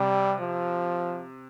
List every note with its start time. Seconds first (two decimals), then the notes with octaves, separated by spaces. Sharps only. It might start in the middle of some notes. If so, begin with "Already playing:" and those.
Already playing: C3 G3
0.40 F3